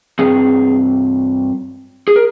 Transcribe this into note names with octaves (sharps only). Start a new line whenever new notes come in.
G2 F3 C4 G#4
G#4
A#4